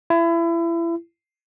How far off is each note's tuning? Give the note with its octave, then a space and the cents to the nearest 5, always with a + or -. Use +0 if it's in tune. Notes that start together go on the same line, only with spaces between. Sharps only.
E4 +30